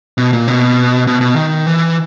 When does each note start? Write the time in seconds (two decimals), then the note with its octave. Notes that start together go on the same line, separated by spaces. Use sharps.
0.18 B2
0.33 A#2
0.48 B2
1.07 B2
1.21 B2
1.36 D#3
1.66 E3